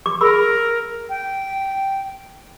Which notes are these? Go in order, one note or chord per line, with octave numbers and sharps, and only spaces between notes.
D6
G#4 A#4 B5 E6
G5